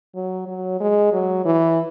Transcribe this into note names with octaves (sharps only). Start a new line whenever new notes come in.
F#3
F#3
G#3
F#3
E3